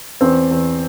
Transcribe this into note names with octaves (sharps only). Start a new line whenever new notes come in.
E2 C4
E2